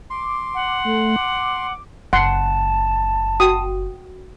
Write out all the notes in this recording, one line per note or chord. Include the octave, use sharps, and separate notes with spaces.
C6 D6
F#5
A3
D6
F#1 F#5 A5 C6
F#4 F#5 G5 D#6